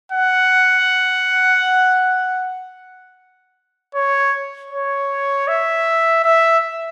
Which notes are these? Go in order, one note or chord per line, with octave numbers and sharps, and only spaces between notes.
F#5
C#5
C#5
E5
E5